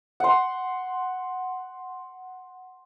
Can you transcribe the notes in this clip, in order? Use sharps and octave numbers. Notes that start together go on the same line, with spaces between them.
F#5 C6